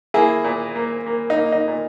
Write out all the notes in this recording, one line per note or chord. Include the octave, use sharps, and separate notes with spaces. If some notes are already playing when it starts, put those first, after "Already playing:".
A#3 E4 G#4
A#2
A#3
A#3
D#4
A#3
D#4
A#2